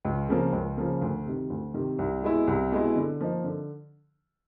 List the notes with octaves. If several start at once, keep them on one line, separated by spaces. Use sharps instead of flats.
C#2
C#3 F3 A#3
C#2
C#3 F3 A#3
D2
C3 D#3
D2
C3 D#3
C2
B2 G#3 B3 E4
C2
B2 G#3 B3 E4
D3
F3 A#3 D#4
D3